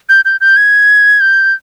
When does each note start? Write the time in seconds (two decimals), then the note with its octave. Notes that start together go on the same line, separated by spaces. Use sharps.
0.09 G6
0.25 G6
0.41 G6
0.57 G#6
1.21 G6